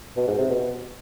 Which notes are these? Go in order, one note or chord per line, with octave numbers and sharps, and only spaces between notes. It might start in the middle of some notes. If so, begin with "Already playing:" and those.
B2
G#2
C3
B2